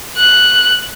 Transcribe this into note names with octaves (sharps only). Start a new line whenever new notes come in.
F#6